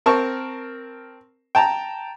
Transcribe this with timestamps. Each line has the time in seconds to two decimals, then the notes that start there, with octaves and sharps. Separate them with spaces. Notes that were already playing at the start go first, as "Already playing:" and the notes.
0.06 C4 A#4 A5 C#6
1.55 G5 A5 A#5